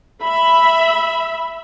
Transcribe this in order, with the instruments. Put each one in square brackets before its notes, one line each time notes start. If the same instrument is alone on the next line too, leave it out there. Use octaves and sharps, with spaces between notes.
[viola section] E5 B5